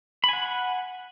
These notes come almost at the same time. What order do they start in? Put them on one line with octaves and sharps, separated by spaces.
B5 G#5 F#5